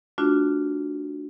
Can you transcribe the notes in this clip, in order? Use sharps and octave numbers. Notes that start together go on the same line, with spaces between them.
A3 D4 F4 F#4